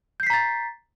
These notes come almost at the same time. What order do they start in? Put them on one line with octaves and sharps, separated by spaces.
G6 C7 B6 A#5 A6